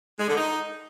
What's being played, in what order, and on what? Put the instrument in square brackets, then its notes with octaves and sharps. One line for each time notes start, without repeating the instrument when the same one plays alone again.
[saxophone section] G#3
D3
D#4